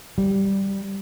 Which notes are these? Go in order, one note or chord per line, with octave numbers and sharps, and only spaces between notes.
G3